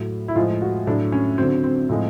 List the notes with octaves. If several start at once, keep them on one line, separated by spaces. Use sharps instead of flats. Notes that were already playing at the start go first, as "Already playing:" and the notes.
Already playing: A2 F#3
E4
A2 F3 G#3 F4
F#4
A2 F#3 D4
C#4
D3 F#3 C4
C4
A2 F3 G#3 C4